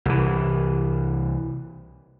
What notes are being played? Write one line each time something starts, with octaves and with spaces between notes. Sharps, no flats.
C2 E3